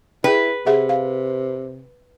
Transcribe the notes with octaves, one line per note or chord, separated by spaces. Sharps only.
E4 G#4 B4 G5
C3 G#4 E5 F#5
F5